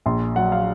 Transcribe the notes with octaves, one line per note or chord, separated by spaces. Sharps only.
A#1 C6
F#3 F#5
F5